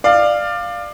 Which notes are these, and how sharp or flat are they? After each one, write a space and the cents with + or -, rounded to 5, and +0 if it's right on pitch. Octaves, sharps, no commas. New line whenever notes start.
D5 +20 F5 +0